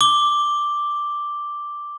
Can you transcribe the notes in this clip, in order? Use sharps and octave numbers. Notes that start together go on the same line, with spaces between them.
D6 G7